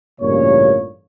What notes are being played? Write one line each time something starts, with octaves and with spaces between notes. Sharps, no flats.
A1 G2 A#2 C#3 A#3 C#5